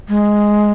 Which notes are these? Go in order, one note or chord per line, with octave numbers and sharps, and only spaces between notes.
G#3